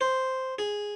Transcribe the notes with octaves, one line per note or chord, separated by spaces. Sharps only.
C5
G#4